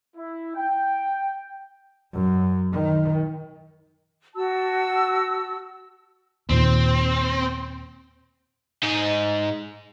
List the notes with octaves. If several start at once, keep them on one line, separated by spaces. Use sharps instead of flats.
E4
G5
F#2
D#3
F#4 A5 E6
D#2 A#2 C4
G#2 D#4